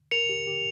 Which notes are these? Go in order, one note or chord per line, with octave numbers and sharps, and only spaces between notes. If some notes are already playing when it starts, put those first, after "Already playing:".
A#4 C#7 F7
G4
G4